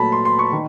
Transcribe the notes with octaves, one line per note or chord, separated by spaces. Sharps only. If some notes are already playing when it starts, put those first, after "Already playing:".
Already playing: A#2 F#3 A3 A5 B5
C6
C6
C#6
D#3